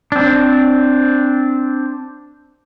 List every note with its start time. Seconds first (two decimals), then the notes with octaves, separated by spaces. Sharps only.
0.12 C4 D4